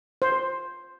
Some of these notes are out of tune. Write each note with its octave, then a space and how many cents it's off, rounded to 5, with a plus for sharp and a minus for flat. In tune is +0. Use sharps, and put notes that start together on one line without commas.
C5 +5